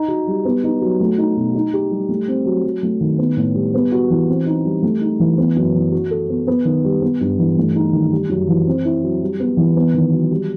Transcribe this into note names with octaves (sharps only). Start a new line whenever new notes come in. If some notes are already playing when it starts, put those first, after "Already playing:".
Already playing: D#4
F#4
G3
B3
D#4
F#3
A3
D#4
B2
D#4
G4
G3
A3
C4
F#3
F#3
A3
D#3
B3
A2
G3
B3
F#4
E3
C4
D#4
G3
A3
D#4
E3
B3
F#2
E3
F#4
A4
B3
B3
D#3
G3
B3
G2
E3
A3
D#4
D#3
G3
F#2
E3
C4
E4
F#3
G3
B3
E3
B3
D#3
F#3
G3